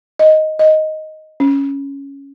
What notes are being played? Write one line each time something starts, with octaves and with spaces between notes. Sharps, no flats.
D#5
D#5
C#4